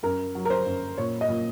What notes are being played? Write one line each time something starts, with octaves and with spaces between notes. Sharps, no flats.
F#2 A#4
F#3
A#4
C5
F#2
A#2 C#5
D#5
A#2